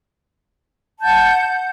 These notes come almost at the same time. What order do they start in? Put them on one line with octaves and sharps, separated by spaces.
A5 G6 F#5